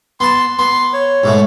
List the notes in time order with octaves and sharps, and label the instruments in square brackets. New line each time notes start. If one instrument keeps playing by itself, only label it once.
[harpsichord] B3 A5 [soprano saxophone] C6
[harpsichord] B3 [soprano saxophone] C6
[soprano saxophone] C#5
[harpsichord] G#2 B2 A3